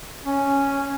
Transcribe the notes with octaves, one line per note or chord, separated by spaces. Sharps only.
C#4